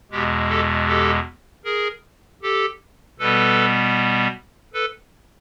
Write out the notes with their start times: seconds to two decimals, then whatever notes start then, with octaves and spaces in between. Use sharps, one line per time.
0.11 E2 B2 G#3 G4
0.49 G4 A4
0.88 G4 A4
1.65 G#4 A#4
2.42 G4 A4
3.19 B2 G3 B3 A4 B4
4.74 A4 B4